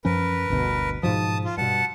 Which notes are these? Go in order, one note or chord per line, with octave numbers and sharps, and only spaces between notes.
F#2 F3 C#4 A#4 B4
G1 D2 B2
G#2 B2 F3 A5 D#6
F4
G2 B2 F#5 A5